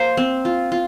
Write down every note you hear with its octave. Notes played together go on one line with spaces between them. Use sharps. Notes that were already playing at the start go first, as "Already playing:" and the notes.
Already playing: A#3 C5
C4
F4
F4